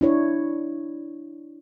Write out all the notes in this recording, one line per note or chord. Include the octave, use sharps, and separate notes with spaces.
D4 E4 C#5